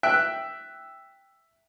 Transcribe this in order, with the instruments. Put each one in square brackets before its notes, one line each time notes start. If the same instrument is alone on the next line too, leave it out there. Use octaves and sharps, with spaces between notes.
[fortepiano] E5 G5 F#6